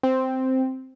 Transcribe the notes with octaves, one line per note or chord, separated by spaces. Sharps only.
C4